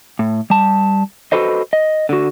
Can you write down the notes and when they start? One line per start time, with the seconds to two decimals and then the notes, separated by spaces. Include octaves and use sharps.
0.19 A2
0.50 G3 A5
1.32 F#4 A4 B4 C5 D#5
1.73 D#5
2.09 D3 F#4